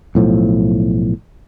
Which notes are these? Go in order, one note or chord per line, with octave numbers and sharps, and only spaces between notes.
B1 A2 F3